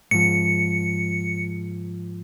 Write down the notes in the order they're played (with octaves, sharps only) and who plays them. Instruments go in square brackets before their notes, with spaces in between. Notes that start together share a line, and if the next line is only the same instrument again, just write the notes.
[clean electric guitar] G#2 F3 [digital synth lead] C#7